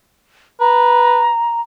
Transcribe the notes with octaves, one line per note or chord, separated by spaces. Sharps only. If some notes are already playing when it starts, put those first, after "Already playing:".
B4 A#5